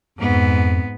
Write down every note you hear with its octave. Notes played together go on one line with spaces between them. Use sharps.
F2 G#2 B3